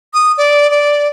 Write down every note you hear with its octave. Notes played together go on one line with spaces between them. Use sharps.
D#6
D5
D5